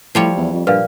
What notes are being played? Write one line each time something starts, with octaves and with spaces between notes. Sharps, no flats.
A2 F3 G3 C#5
E2
F2
G2 A#2 B4 D5 F5